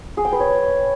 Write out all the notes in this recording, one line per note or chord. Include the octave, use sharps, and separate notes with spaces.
G#4
G5
B4
C#5